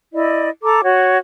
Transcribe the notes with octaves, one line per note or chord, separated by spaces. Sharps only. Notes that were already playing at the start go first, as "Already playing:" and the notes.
E4 D5 D#5
A4 A#5 D6
F#4 C#5